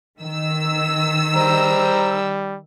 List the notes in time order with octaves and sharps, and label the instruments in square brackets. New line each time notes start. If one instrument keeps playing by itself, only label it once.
[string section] D#3 E6
[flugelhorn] G3 [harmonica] C5 A#5